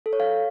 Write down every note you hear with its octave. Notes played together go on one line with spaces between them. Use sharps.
A4
C#5
F5